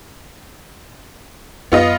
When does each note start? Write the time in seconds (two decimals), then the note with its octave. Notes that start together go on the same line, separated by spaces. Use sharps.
1.72 F#2 B3 F4 D#5